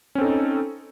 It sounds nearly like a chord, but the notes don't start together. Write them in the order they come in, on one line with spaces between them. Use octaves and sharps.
C#4 C4 A4 D#4